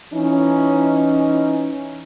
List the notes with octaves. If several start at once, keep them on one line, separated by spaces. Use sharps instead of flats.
E3 C#4 D#4